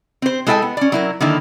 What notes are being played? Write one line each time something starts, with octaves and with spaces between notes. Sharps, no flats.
C4 C5
G#3 E4 A4 E5 G5 G#5
B3
C#4 D5
F#3 E4 A#4
D3 D#3 A#3 E4